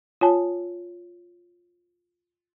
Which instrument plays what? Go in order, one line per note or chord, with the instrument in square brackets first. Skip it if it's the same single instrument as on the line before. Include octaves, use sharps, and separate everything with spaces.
[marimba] F4 C#5 G#5 A5